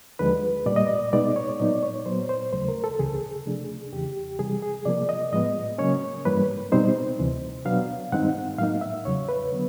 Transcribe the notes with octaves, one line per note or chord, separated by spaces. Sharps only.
D#2 D3 F3 G#3 B4
A#2 G3 A#3 D5
D#5
D5
B2 G#3 B3 D#4 D5
C#5
A#2 F#3 B3 D#4 D5
C#5
A#2 F#3 B3 C5
C5
D#2 C#3 F#3 A3 C5
A#4
A4
C#2 C#3 E3 G#4
C3 F3 A3 D4
E2 C#3 E3 G4
C3 E3 G3 G#4
G#4
C3 F3 A#3 D5
D#5
A2 F3 G#3 B3 D#5
C#3 F#3 A#3 C#4 C#5
G2 E3 G3 A#3 B4
B2 G3 C4 D#4 C5
D2 C3 E3
B2 F#3 B3 D4 F5
G2 D#3 G#3 C4 D#4 F#5
A2 F#3 A#3 D#4 F5
E5
E2 C#3 F#3 C#5
B4
D3 F#3 B3